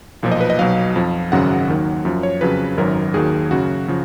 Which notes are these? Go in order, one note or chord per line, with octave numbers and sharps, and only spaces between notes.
B1 A#2 F3
D#5
B4
D#5
B1 B2 F#3 F5
F2 F3
G#1 F#2 C#3 F#3 F#5
D#2 D#3 F#3
F#2 F3
C#5
F2 C#3 F#3 B4
G#1 F#2 D#3 F#3 A#4
D#2 D#3 F#3 G#4
F#2 C#3 F#3 F#4
C#3 F3